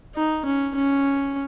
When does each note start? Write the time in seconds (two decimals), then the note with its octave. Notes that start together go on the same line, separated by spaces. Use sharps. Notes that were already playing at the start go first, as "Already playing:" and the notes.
0.15 D#4
0.45 C#4
0.75 C#4